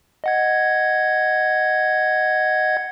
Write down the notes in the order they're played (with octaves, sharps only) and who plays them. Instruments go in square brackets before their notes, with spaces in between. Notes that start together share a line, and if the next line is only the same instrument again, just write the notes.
[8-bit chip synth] D#5 F#5 G#6